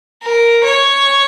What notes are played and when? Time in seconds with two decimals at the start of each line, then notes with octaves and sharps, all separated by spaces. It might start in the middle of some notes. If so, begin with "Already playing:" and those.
0.23 A#4
0.64 C#5